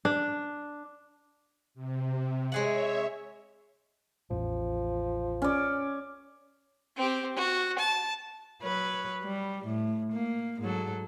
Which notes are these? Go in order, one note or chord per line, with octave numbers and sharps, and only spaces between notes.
D4
C3
G#3 G#4 C#5 E5 F#5
A1 E2 F3
C#4 D5
C4 G4
F#4
A5
F#3 B4 C#5
G3
A2
A#3
G#2 F#3 A4